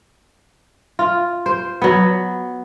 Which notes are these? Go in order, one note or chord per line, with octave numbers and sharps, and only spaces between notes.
F4
C5
F#3 B3